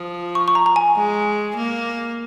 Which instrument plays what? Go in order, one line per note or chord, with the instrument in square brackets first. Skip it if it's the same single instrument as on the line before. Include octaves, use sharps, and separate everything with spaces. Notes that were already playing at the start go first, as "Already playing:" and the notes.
Already playing: [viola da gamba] F3 [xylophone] D#6
[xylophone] C#6
C#6
A#5
A#5
G#5
[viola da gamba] G#3
A#3